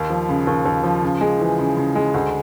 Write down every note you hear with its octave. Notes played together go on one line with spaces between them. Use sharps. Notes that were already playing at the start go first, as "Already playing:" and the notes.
Already playing: D#2
F3
C#3
D#2
D#2
F3
C#3
G#3
E3
C#3
C#3
G#3
D2